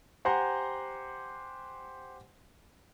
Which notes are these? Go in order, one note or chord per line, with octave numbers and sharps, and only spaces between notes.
G4 C5 F#5 G#5 A#5 C6